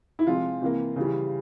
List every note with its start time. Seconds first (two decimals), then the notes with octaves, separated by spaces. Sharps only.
0.19 E4
0.27 C3 F3 G#3 F4
0.62 C3 E3 A#3
0.96 C#3 E3 G3